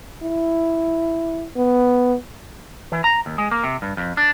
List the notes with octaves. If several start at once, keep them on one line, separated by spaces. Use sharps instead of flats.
E4
B3
E3
A#5
D#2
G#3
A#3
C3
G2
F2
D4